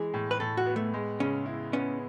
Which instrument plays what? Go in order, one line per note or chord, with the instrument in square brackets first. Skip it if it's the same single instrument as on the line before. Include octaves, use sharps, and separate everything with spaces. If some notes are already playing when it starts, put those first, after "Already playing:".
Already playing: [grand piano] E3 G#3 [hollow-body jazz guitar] G#4
[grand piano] A2
[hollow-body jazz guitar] B4
[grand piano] A2 [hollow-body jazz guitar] A4
[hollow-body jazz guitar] F#4
[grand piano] B3
[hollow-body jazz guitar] A3
[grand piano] G#3
[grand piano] C#3 [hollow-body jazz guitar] C#4
[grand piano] E4
[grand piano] B3 [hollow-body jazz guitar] C#4